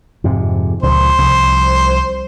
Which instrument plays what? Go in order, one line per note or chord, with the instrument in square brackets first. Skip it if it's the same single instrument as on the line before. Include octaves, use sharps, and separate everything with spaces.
[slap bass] F2 G#2 C3
[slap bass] C#2 A#2 F3 [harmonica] C5
[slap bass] C2 F3